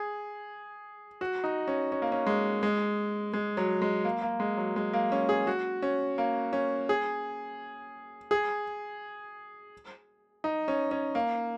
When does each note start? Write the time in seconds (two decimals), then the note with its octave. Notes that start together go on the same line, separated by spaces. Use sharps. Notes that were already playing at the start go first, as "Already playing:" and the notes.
Already playing: G#4
1.21 F#4
1.44 D#4
1.68 C#4
1.92 C#4
2.02 A#3
2.12 C#4
2.27 G#3
2.63 G#3
3.33 G#3
3.57 F#3
3.82 G#3
4.04 A#3
4.22 A#3
4.40 G#3
4.57 F#3
4.76 G#3
4.93 A#3
5.12 C#4
5.29 G#4
5.47 F#4
5.83 C#4
6.18 A#3
6.53 C#4
6.89 G#4
8.31 G#4
10.44 D#4
10.68 C#4
10.91 C#4
11.15 A#3